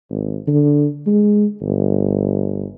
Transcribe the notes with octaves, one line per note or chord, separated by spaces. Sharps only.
G#1
D3
G#3
G1